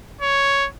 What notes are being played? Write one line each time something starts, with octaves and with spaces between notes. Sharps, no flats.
C#5